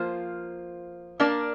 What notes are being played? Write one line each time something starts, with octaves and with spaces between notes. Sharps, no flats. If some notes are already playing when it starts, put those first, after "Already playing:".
Already playing: F3 A#3 F4 C5
A#3 D4 A#4 D5